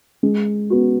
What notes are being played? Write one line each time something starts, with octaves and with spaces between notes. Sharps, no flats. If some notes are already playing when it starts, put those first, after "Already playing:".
G#3
B3 F#4